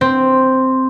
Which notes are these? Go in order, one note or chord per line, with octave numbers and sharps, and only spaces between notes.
C4